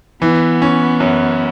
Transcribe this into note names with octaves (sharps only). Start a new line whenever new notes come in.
E3 B3
C#4
F#2